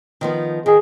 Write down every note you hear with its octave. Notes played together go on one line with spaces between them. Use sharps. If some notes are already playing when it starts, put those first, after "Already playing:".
D#3 F3 B3
D#3 G#4